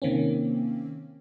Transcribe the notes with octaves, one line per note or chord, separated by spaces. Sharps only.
C3 D#3 A#3 C4 C#4